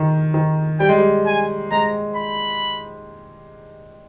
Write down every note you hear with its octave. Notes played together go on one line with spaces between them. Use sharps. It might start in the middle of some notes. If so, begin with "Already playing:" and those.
Already playing: D#3
D#3
G3 G5
G#3
G3
G#5
G#3 A#5
B5